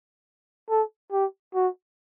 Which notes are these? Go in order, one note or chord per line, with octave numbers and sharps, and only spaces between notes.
A4
G4
F#4